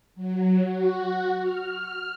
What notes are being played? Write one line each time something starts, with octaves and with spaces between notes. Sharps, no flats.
F#3
F#4
F6